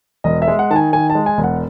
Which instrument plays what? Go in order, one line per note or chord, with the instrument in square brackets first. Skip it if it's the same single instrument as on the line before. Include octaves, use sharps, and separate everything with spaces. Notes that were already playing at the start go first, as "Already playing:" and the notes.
[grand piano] E1 D#5
E5
G#3
F#5
D#3 A5
G#5
D#3 G#5
A5
G#3
G#5
E1
F#5